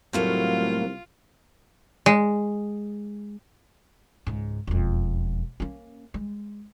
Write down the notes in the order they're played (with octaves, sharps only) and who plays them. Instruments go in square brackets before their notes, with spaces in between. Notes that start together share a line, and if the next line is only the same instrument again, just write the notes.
[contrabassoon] C2 [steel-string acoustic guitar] A2 A3 A#3 [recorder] F#3 [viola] F4
[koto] G#3
[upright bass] C#2 G#2
E1 F2
A#3 C#4
G#3